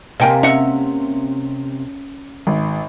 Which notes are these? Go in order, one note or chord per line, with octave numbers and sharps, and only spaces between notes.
C3 A#3 D#5 G5 G#5
C#4 D#5 E5 F#5
G#1